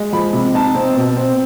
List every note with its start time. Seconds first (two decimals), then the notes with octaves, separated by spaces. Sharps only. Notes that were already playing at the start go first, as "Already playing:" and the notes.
Already playing: G#3
0.13 F3 B5
0.33 C3
0.54 D#4 A5
0.75 C4
0.96 B2
1.17 C4